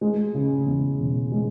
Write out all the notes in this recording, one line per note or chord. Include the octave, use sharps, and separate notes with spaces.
G#3
C#3
E2
E1
G#3